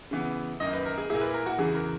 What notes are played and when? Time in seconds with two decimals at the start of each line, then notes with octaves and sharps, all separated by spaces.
0.11 C#3 E3 B3
0.60 F#2 D#3 A#3 D#4 D#5
0.73 B4
0.86 A#4
0.98 G#4
1.10 A#2 A#3 E4 G#4
1.21 B4
1.34 A#4
1.46 F#4
1.59 E2 C#3 E3 G#4
1.75 A#4